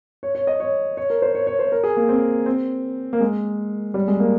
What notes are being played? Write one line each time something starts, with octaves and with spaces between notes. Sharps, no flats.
C#5
C#5
D#5
C#5
C#5
A#4
C5
C#5
C#5
C5
A#4
G#4
A#3
C4
C4
A#3
G#3
G3
G#3
A#3